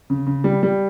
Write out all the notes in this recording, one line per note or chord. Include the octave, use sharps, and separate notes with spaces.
C#3
C#3
G3
G3